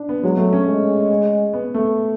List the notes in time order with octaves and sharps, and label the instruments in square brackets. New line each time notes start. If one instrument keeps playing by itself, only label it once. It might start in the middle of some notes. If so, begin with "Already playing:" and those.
Already playing: [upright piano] D4
B3
[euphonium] F#3 [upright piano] G#3
[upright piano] A3
C#4
[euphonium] G#3
[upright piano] B3
A3